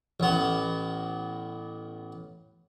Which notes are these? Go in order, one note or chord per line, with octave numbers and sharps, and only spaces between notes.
A1 B3